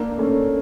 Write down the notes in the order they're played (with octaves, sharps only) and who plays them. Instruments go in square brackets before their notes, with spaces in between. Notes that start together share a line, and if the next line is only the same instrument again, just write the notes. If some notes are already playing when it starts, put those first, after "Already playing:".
Already playing: [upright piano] A#3 D4
A3 C#4